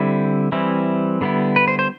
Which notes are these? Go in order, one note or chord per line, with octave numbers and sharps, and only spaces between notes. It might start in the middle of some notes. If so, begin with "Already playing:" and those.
Already playing: D3 G3 C4 E4
E3 G3 C4 E4
D3 G3 B3 E4
B4
C5
C5